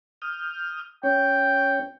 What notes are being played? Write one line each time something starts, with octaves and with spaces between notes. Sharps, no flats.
D#6 F6 G6
C#4 C#5 G5